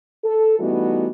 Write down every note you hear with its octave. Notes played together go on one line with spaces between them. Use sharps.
A4
E3 G3 A3 B3 D#4 F#4